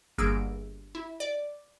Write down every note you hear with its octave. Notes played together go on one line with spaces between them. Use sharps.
G1 A#3 G#4 E6 D7
E4
D5